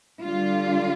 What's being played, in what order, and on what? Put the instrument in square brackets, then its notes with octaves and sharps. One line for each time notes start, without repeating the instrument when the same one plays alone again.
[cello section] D3 G3 D4 F4